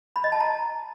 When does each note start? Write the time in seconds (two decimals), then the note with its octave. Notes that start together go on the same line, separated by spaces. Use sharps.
0.16 B5
0.24 D#5
0.32 A5
0.40 A#5